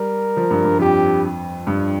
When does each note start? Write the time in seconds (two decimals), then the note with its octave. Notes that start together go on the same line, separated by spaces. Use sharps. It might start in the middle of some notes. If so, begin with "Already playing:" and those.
Already playing: G3 A#4
0.37 F3
0.51 G2
0.65 G2
0.79 F2 G4
1.67 G2